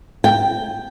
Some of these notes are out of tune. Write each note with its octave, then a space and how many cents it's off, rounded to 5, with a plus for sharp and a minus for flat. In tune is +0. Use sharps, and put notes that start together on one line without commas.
G5 +5